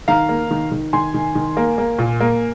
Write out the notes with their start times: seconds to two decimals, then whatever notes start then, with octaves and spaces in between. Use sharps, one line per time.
0.08 D#3 F5 A#5
0.29 A#3
0.51 D#3
0.72 D#3
0.93 D#3 G#5 C6
1.14 D#3
1.35 D#3
1.57 A#3
1.78 A#3
1.98 A#2
2.20 A#3